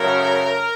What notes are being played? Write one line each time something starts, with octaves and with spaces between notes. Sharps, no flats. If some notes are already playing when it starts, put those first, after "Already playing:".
Already playing: F#2 C#3 F#3 A3 A#4